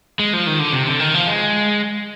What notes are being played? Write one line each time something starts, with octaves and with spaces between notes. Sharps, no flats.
G#3
F3
D#3
D3
C3
D3
D#3
F3
G#3